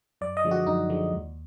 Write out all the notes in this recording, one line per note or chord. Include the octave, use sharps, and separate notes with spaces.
F#2 D5
D#5
D3 F3 G#3
F#4
F#2 D#4
D3 F3 G#3
D#2